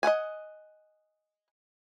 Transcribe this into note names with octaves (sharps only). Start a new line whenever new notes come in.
D#5 F5 F#5 G#5